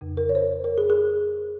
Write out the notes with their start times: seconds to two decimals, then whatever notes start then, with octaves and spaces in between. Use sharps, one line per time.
0.01 F2 C#3
0.17 A#4
0.29 C#5
0.35 C5
0.64 A#4
0.78 G#4
0.90 G#4